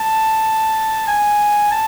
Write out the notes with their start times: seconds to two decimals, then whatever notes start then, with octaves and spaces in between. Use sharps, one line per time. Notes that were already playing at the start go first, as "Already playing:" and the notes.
Already playing: A5
1.08 G#5
1.71 A5